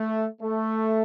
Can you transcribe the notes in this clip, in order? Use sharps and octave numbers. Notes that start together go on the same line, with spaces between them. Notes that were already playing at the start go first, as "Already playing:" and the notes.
Already playing: A3
A3